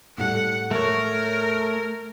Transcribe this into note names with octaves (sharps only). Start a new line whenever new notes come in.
A2 G3 A4 F#5
A3 A#4 C#5